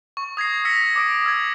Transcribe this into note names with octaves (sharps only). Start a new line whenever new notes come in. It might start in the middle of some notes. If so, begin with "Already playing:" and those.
C#6
D#6 G#6 A#6 C7
E6 A#6 B6 C#7
D6 D#6 D7
E6 G#6